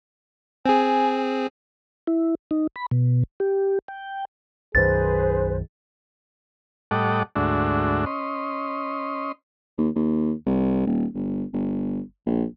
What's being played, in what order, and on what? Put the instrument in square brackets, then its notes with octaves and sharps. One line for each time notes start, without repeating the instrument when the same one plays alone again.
[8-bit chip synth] C4 G#4 [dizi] G#5
[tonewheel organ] E4
D#4
B5
B2
G4
G5
[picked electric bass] B1 F#2 D#3 [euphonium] G#4 [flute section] B4 C5 [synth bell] A6
[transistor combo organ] A2 G3 A4 D#5 F#5 D6
D2 G#2 A3 D4 F#4 E5
C#4 D#5 C6
[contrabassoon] D#2
D#2
C2
D#1
G1
G1
A#1